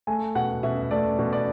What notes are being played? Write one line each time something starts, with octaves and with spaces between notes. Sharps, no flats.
A3 G#5
B2 F#5
B2 E5
A3 D5
B2
D5